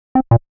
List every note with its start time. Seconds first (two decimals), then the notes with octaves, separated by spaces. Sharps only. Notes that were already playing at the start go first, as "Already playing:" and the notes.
0.15 C4
0.31 A#2